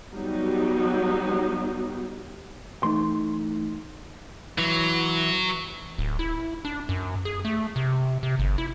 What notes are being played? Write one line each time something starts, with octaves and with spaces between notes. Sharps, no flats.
F#3 G3 B3 D#4
E3 A3 D#4 C6
E3 F#3
D1
E4
D4
F#2
G#4
A3
C3
C3
G1
E4